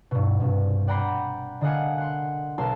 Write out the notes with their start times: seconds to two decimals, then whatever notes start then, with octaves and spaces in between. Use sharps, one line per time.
0.11 G2 B2
0.40 C2 G2
0.87 D5 F#5 G5 A#5 B5 C7
1.61 D3 A#4 D#5 F5 F#5 G#5
1.98 F#5 C6
2.58 B1 A4 A#4 A5 C6